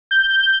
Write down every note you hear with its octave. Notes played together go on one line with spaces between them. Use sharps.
G6